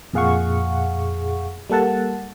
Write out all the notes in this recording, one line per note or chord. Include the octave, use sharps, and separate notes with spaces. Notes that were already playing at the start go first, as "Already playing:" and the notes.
F2 A#2 G#4 F5 F#5 C#6
G3 A#3 A4 F#5 A5